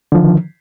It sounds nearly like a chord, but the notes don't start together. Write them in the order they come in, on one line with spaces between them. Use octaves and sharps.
D3 F3 D#3